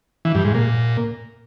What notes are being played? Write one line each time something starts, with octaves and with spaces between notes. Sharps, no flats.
E3
G2
G#2
A#2